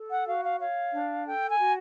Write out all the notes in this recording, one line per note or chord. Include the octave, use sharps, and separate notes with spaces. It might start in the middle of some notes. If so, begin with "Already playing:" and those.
Already playing: A4
F#5
F#4 F5
F5
C#5 F5
D4
A4 G5
G#5
F#4